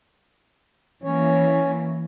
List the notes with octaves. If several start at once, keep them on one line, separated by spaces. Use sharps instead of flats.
E3 A#3 C#4 C#5